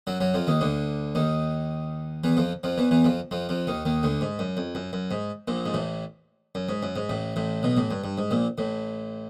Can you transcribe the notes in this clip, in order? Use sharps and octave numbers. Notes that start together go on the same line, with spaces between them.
F#2 F#3
F#2 F#3
F2 F3
D#2 D#3
D2 D3
D#2 D#3
E2 E3
F2 F3
F2 F3
E2 E3
E2 E3
F2 F3
F2 F3
F2 F3
D#2 D#3
D#2 D#3
D2 D3
G#2
F#2
F2
F#2
F#2
G#2
A#1 A#2
G#2
A1 A2
F#2
G#2
F#2
G#2
A1 A2
A1 A2
B1 B2
A1 A2
G2
G2
G#2
A#1 A#2
A1 A2